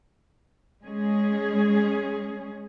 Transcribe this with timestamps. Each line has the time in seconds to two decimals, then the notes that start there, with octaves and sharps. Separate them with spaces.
0.84 G#3 C#4 G#4